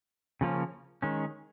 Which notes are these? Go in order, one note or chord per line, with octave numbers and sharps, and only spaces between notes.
C#3 F3 A#3 C#4
D#3 G#3 C#4